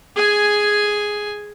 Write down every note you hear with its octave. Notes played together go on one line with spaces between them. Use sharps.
G#4 G#5